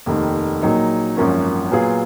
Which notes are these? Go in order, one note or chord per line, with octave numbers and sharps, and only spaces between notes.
F1 D#2 D#3
A#1 A#2 F#3 A#3 D#4
G#1 F#2 F3 A#3 C#4
A#2 F#3 B3 F4 G#4